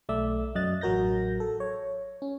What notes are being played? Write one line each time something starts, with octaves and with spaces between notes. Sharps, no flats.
B1 A3 D5 E5 E6
F#2 F#3 D#5 F#6 A6
A1 F#3 F#4 A#4 G6 A#6
A4
C#5
C#4